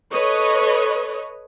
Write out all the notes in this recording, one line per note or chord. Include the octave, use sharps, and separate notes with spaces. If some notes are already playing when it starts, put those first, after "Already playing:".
A4 B4 C#5 D#5